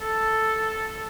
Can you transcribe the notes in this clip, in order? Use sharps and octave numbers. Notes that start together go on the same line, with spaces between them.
A4